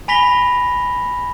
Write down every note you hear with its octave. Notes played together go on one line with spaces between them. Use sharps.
G#5 B5 A#6 B6 F7 G7